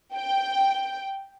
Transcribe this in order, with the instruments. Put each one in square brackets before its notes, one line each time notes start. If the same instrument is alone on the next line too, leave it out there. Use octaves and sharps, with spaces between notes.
[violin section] G5